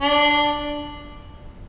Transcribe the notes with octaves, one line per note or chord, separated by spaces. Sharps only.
D4